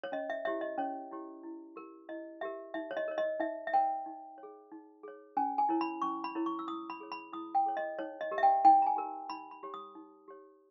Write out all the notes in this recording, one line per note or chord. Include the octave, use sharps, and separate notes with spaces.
C#5
C#4 D#5
E5
E4 G4 C#5 E5
D#5
C#4 C#5
E4 G4 C#5
E4
G4 A#4
E4 D#5
G4 A#4 E5
D#4 E5
C#5
D#5
A#4 C#5
D#5
D#4 E5
E5
A#4 C#5 G5
D#4
C#5
G#4
D#4
G#4 C#5
C#4 G#5
G#5
E4 A#4 C#5
B5
C#4 C#6
B5
E4 A#4 C#5
C#6
E6
E4 D#6
B5
G#4 C#5
B5
E4 D#6
G5
G#4 C#5
D#5
D#4 C#5
D#5
G4 A#4
E5
G5
D#4 G5
A#5
G#5
G4 A#4
D#4 B5
B5
G4 C#5
D#6
D#4
G4 C#5